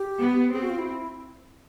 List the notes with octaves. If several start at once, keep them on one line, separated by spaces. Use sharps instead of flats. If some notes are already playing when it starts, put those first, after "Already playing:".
Already playing: G4
B3
C4 G#4
F#4
F4
E4